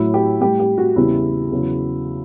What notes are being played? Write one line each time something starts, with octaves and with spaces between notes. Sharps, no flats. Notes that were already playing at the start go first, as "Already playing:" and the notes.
Already playing: A2 F#3 E4
G4
A2 G3 G4
G4
F#4
E2 C#3 G3 E4
E2 C#3 F#3